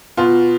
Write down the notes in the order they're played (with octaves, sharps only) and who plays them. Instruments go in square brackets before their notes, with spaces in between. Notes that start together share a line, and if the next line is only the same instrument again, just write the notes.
[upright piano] B2 F4